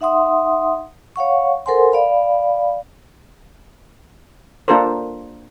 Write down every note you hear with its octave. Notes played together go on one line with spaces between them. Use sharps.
D#4 E5 F#5 C6 D#6
C#5 F5 F#5 C#6
A4 A#4 C5 F#5 G#5 C6
D5 F5 B5
A#3 D4 F4 A4 A#4 C5